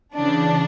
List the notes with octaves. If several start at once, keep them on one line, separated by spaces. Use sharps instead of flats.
C#3 E3 D4